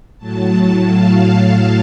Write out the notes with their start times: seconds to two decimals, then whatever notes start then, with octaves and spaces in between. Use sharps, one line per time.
0.18 A2 F#3 A5
0.52 A5
0.85 F5